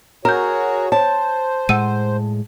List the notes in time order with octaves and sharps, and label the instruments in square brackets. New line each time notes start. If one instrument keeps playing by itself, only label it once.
[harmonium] F#4 G#4 C#5 [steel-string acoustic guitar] A#4 [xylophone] A#5 G6
[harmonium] C5 [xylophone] C#5 [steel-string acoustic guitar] A5
[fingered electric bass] A2 G#3 [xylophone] F#5 E6 D#7